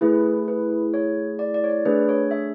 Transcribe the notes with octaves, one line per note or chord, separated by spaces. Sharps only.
A3 E4 G#4 B4
B4
C#5
D5
D5
C#5
D5
A3 D4 G#4 B4
C#5
E5